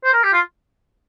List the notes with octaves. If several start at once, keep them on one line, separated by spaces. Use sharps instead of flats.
C5
A#4
G4
F4